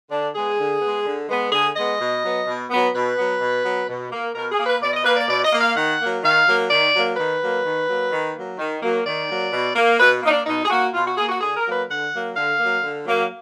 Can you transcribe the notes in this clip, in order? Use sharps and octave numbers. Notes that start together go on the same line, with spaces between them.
D3 D4
G#3 B3 G#4
D3
G#3 B3
D3
G#3 B3
D3 G#4
G#3 B3 D#5
B2
F#3 B3
B2
F#3 B3
B2 B4
F#3 B3
B2
F#3 B3
B2
A#3
B2 A#4
G#4
A#3
B4
B2 D5
D#5
A#3 B4
D5
B2 D5
D#5
A#3
F5
D#3 F#5
F#3 A#3
D#3 F5
F#3 A#3
D#3 D5
F#3 A#3
D#3 B4
F#3 A#3
D#3
F#3 A#3
D#3
F#3 A#3
D#3
F#3 A#3
D#3 D5
F#3 A#3
B2
A#3
B2 B4
A#3 D#4
D4
B2 D#4
G#4
A#3 F#4
B2 F4
F#4
A#3 G#4
F#4
D3 G#4
A#4
F#3 A#3
B4
D3 F#5
F#3 A#3
D3 F5
F#3 A#3
D3
F#3 A#3